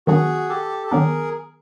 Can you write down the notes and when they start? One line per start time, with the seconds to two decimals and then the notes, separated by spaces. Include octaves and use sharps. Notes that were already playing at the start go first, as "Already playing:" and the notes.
0.07 D#3 F#3 B3 D4 F#4 G#4
0.49 G4 A4
0.87 A4
0.91 D#3 F#3 B3 D4 G#4 A#4